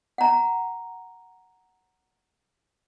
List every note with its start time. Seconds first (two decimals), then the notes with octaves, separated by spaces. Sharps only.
0.18 F#5 A#5